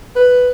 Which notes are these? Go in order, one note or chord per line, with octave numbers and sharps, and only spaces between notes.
B4